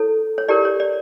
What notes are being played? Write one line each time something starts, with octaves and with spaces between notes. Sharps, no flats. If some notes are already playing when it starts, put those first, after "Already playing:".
Already playing: E4 A4 C#5
C#5
E4 G4 A#4 C#5 D5
C#5
D5